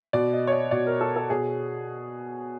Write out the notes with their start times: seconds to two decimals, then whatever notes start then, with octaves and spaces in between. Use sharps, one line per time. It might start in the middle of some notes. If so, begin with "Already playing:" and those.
0.13 B2 D5
0.33 D#5
0.47 C#5
0.52 D5
0.71 B2 D5
0.87 A#4
1.01 A4
1.16 A4
1.30 B2 G#4